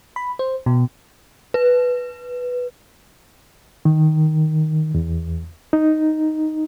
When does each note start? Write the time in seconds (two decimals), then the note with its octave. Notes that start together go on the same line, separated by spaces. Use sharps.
0.16 B5
0.39 C5
0.66 B2
1.54 B4
3.85 D#3
4.95 E2
5.73 D#4